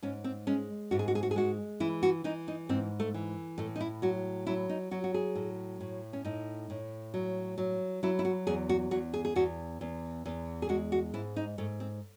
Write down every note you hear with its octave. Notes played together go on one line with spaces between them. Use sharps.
G#2 C#4
C4
G#3 C#4
G#2 F#4
G#4
F#4
G#4
F#4
G#4
G#3 F#4
E3 E4
F#4
E3 D#4
D#4
G#2 C4
A3
E3
A2 A3
D#4
E4
F#3 F#4
F#3 E4
D#4
F#3 F#4
F#4
G#4
A2
A2
C#4
A2 D#4
A2
F#3
F#3
F#3 E4
E4
F#4
E2 G#4
F#4
E2 F#4
G#4
G#4
E2 F#4
E2
E2
G#4
G#3 F#4
F#4
G#2 E4
D#4
G#2 A3
C4